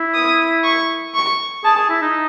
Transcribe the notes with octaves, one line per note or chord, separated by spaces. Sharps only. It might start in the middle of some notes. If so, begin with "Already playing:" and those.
Already playing: E4
D#6
C#6
C#6
G#4 A5
G#4
E4
D#4